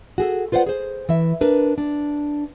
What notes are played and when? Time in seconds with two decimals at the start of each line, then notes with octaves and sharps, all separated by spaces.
0.18 F#4 G#4 A4
0.52 F4 B4 C5 D5 F#5
0.66 G#4 C5
1.09 E3 E5
1.41 D4 A#4 B4
1.78 D4